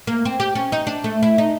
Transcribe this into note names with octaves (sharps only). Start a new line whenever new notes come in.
A#3
C4
G4
C#4
D#4
D4
A3
E4
D#4